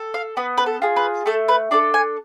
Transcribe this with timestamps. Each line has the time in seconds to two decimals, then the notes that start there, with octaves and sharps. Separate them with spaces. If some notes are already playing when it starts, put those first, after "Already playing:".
Already playing: A4
0.14 F5
0.37 B3 B4
0.58 B4
0.66 A4
0.82 F4 G#4
0.96 B4
1.26 A3 A4
1.48 B4
1.71 D4 A4 D5
1.94 G#5